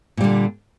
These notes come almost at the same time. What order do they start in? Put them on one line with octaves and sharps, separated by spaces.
A#2 G3 D3